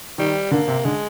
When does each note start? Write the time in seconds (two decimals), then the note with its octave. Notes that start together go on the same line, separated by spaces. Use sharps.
0.18 D#3 G3
0.51 D3 A#3
0.68 C3
0.85 D3 G#3